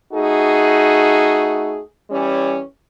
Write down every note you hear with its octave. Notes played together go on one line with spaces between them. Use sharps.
A3 D#4 F#4 G#4
E3 G3 C#4